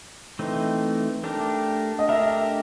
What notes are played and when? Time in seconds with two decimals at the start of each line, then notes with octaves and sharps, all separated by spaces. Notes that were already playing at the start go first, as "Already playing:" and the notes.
0.39 E3 A3 C4 D#4
1.24 A3 D4 G4 A#4
1.99 D#5
2.09 A3 D4 G4 A#4 E5